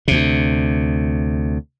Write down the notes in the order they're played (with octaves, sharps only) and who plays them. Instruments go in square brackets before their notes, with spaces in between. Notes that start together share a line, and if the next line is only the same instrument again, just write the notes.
[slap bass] D2 C3